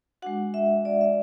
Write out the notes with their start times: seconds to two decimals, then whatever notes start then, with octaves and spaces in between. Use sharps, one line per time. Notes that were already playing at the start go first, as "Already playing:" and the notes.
0.22 G#3 D4 F#4 F#5
0.54 E5
0.85 D5
1.01 E5